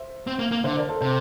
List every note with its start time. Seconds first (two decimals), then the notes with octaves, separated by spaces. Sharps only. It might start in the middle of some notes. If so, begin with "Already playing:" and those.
Already playing: C5 E5
0.27 C4
0.39 A#3
0.51 A#3
0.64 D3 C5 E5
0.77 A#4 D5
0.89 A4 C5
1.01 C3 A4 C5